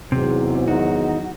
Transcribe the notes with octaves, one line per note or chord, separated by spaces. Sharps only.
E2 G#2 C3 F#3
D#3 D#4 F#4